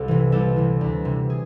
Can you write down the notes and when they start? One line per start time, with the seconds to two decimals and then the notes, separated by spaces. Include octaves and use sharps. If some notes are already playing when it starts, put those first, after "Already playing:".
Already playing: C2 A4
0.08 C3 E3
0.32 C2 A4
0.56 C3 E3
0.81 D2
1.05 C3 E3
1.30 G#4